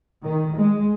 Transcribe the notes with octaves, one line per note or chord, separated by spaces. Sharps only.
D#3
G#3